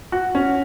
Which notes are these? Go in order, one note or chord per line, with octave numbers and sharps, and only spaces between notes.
F#4
C#4